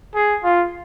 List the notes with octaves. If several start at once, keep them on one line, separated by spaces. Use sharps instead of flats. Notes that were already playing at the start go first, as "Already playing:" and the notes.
G#4
F4